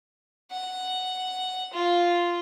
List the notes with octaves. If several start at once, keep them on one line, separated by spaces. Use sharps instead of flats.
F#5
F4